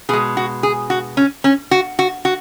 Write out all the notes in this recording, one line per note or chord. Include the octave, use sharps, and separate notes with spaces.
B2 G#3 G#4
F#4
G#4
F#4
C#4
C#4
F#4
F#4
F#4